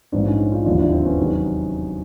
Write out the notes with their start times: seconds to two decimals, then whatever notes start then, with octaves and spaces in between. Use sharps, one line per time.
0.12 A#1 G#2 E3 C4 D4
0.26 C#4 D#4
0.52 D#4 F4
0.65 E1 D#2 D3 F3 D4 E4
0.78 D4 E4
0.92 C4 D4
1.05 B3 C#4
1.19 E2 C3 D#3 F#3